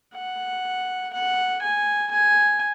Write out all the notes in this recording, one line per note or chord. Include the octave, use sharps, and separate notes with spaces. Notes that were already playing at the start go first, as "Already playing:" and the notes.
F#5
F#5
G#5
G#5